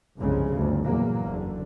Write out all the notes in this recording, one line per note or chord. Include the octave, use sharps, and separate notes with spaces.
G1 C2 F2 C#3 G#3
G1 D2 G#2
E2 A#2 F#3 A#3
F#1 D3